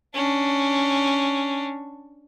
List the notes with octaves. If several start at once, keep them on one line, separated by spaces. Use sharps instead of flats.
C#4 D4